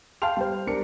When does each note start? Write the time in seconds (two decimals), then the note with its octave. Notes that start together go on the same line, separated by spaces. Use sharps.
0.22 F5 G5 A5 C6 F6 F7
0.37 G3 C5
0.67 G3 D4 A#4 C#7